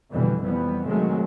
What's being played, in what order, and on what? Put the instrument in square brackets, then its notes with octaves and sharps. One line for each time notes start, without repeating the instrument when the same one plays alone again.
[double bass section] F1 B2 D3 E3 G3
F2 E3 G3 B3
C3 D#3 F#3 G#3 A3